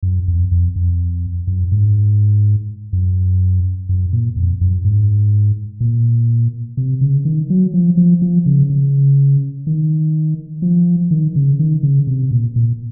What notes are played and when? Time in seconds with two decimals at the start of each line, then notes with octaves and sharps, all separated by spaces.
0.03 F#2
0.28 F2
0.51 F2
0.76 F2
1.47 F#2
1.72 G#2
2.93 F#2
3.89 F#2
4.13 A#2
4.36 F2
4.61 F#2
4.85 G#2
5.81 A#2
6.77 C3
7.01 C#3
7.25 D#3
7.50 F#3
7.74 F3
7.97 F3
8.22 F3
8.46 C#3
8.70 C#3
9.67 D#3
10.62 F3
11.11 D#3
11.36 C#3
11.59 D#3
11.83 C#3
12.07 C3
12.31 A#2
12.56 A#2